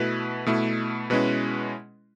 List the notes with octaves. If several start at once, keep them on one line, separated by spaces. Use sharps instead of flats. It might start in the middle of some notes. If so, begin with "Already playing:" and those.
Already playing: B2 A3 E4 B4
B2 A3 E4
B2 G#3 C#4 E4 B4